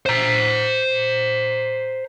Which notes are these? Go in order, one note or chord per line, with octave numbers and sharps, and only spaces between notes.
C5 A#5